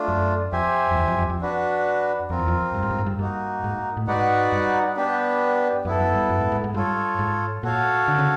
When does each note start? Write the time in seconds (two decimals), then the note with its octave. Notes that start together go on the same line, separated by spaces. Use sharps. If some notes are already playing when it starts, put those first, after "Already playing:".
Already playing: A3 D4 F4
0.08 F#2
0.52 F2 G4 C5 E5 G#5
0.91 F2
0.96 E2
1.08 F2
1.18 F2
1.30 F2
1.41 D4 F#4 B4
2.30 F2 C4 F4 A#4
2.39 E2
2.48 F2
2.74 G2
2.83 G#2
2.91 G2
2.99 G#2
3.06 G2
3.18 G2 A#3 D#4 F#4
3.64 G#2
3.97 A2
4.07 G#2 D#4 F#4 B4 D5 F#5
4.52 G2
4.97 B3 D4 G4 B4
5.85 F#2 B3 E4 A4
6.00 F#2
6.15 G2
6.30 F#2
6.41 G#2
6.52 G#2
6.64 G#2
6.74 G2 F4 A4 C#5
7.19 G#2
7.63 A#2 F#4 A4 C#5 F5
8.08 D3
8.19 C#3